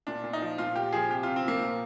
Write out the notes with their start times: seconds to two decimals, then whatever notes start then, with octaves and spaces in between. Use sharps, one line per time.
0.07 A#2 D4
0.24 A#2
0.33 D#4
0.42 F3
0.58 A#2 F4
0.75 A#2 G4
0.93 F3 G#4
1.09 C3 G4
1.23 C3 F4
1.36 C4
1.45 F3 A#3
1.62 A#2